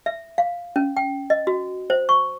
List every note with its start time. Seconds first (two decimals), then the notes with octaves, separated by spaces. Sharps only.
0.06 E5
0.38 F5
0.76 C#4
0.97 G5
1.30 D#5
1.47 F#4
1.90 C5
2.09 C#6